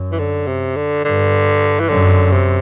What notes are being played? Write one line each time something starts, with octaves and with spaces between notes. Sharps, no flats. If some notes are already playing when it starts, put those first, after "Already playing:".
Already playing: F#2
E3
D3
C3
D3
G2 D3
E3
F#2 D3
C3